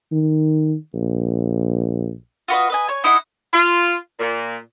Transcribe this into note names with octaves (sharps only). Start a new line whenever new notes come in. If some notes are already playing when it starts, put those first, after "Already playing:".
D#3
A#1
F4 F#4 B4 D#5
B4 D#5 G#5
C#5 G#5
D#4 E4 D#5 F#5
F4
A#2